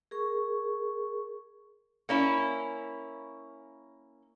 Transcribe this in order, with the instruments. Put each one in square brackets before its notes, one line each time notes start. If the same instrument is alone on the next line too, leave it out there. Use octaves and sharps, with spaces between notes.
[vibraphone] G#4 A#4 C#6
[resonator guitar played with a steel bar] A#3 C#4 E4